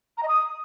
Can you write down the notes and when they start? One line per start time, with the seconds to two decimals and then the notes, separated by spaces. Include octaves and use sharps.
0.18 A#5
0.23 D#5
0.28 D#6